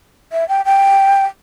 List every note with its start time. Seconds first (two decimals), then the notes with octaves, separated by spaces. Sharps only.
0.32 E5
0.49 G5
0.65 G5